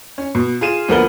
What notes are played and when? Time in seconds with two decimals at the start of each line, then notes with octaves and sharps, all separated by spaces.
0.18 C#4
0.35 B2
0.61 F4 G#4 D#7 E7
0.88 D2 F3 A#3 B3 A#4 G7